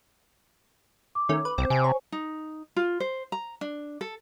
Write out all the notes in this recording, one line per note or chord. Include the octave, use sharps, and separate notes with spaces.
D6
D#3 A3 C#4
B4
C2 C4 C5
C3 G#5 D7
C#5
D#4
F4
C5
A#5
D4
A4